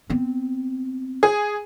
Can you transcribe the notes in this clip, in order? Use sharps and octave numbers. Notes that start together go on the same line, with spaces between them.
B3 C4
G#4